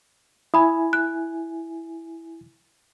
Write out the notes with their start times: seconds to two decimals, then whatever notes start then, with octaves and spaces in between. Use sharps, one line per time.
0.54 E4 G#5 B5 D#6
0.93 F#6